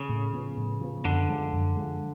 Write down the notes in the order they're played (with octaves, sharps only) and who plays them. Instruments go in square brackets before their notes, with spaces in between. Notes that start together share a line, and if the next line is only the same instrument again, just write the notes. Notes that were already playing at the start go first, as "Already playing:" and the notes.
Already playing: [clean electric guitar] C#3
[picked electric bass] A2
F3 B3
A2
F3 B3
[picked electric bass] F#2 [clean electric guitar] D3
[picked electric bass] F3 G#3
F#2
F3 G#3